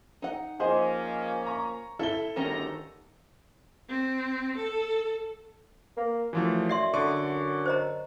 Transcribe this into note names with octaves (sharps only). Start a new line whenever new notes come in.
D#4 F#5
F3 A#3 C#4 G#4 C5 D#5
A#5 C#6
E4 A4 G7
G1 D2 D#3 C#4 G4 A#5
C4
A4
A#3
F#2 E3 F3 A3
D5 E5 C6 C7
F#2 D3 A4 D5 C#6
C5 D#5 A#5